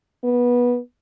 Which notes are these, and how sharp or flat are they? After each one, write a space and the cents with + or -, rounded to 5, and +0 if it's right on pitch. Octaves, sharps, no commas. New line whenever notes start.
B3 -20